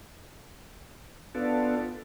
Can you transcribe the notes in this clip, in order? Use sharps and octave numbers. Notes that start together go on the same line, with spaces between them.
B3 D4 F4 A4